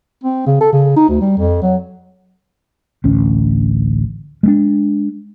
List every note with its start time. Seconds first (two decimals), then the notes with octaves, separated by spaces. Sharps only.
0.24 C4
0.47 C#3
0.61 A4
0.73 C#3
0.96 D#4
1.09 D2
1.21 G3
1.38 F2
1.62 F#3
3.04 A1 D2 C#4
4.43 G#3 A3 D4